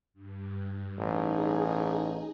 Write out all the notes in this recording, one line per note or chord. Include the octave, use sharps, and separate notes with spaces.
G2
A1 D#4 G#4